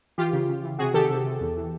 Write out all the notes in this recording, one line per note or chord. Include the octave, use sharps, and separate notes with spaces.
E3 F4 G4
C#3
C#3
E3
C3 F#4 G#4
D#3 G4 A4
C3
C3
E2
E3